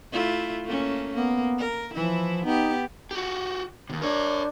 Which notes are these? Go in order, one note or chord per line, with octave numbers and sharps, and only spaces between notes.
A3 E4 F4
A3 A#3 C#4
A#3 B3
A#4
E3 F3 E4
B3 D#4 G4
F#4 G4
D#2 C3
D4 A#4 C#5